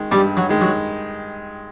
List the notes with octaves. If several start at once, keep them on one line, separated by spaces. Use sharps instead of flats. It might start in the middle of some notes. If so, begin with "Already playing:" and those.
Already playing: D#3 G#3
G2 G3
F#3
D#3 G#3
F#3